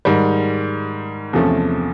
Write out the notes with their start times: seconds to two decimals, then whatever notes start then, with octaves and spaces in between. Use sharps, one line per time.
0.05 G#2 D#3 G3
1.33 E2 C3 F3 A3 C#4